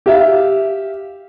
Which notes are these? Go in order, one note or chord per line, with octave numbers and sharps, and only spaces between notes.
G4 E5 F5